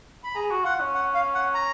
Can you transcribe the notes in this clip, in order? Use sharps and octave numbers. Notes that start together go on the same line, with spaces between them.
B5
G#4 A#5
F#4
F4 F#5
C#4
F#5
F5
F#5
A#5